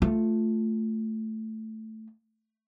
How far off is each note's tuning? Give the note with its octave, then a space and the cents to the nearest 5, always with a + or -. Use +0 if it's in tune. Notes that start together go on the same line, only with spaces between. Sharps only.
A3 +0 F4 +0